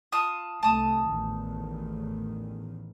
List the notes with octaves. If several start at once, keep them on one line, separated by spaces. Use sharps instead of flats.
F4 A5 D#6
C2 A3 A5 D#6
A1 E2 D#3